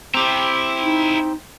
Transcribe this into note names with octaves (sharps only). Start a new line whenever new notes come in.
C4 E4 G4 A#5
D#4